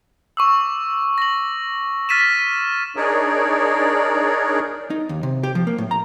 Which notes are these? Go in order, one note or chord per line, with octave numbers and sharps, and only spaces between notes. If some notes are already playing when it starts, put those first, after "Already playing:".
C#6 D6 E6
A#6 F#7
F6 A6 B6 D#7 E7
D4 D#4 G#4 A#4 C#5 D5
D#4
D#2
C3
G4
F3
A#3
A2
A#5